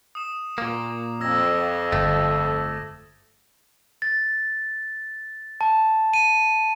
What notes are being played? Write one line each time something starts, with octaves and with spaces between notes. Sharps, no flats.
D#6 E7
A#2 A#3 D6
F2 E6 G#6 A#6
G1 A3
A6
A5
D#7